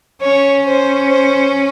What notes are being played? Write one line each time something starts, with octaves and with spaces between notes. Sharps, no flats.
C#4 C#5
C5
C5